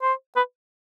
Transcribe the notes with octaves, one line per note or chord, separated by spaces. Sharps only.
C5
B4